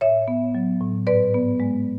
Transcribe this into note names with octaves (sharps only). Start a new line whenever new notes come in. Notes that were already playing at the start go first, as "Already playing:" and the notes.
A2 C#5 E5
B3
F#3
A2
G#2 B4 D5
B3
G#3